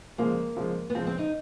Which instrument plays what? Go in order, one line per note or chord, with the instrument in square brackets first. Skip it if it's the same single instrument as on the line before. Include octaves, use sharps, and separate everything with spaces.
[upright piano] C#3 F3 G#3 [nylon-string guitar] A#3
[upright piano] C#3 F3 G#3
[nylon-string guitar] B3
[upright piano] C#3 F3 G#3 [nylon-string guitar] C4
[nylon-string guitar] C4
D#4